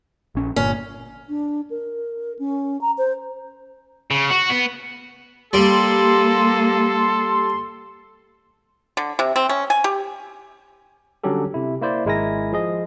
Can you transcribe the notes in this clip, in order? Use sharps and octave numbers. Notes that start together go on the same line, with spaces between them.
A#1 C#4
G1 A#2 C#4
D4
A#4
C#4
A#5
C5
C#3
F#4
B3
G3 A#3 A4 C6
D3
C3
C4
C#4
G#5
G4
D3 F#3 G3 C#4 G4 A4
C3 E4
A#3 E4 C5 D5
G#1 G#3 E4 A#4 G#5 A#6
F3 G#4 D#5